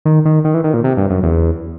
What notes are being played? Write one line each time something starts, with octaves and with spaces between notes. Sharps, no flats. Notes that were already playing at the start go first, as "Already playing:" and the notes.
D#3
D#3
D#3
E3
D#3
A#2
C3
G2
F#2
E2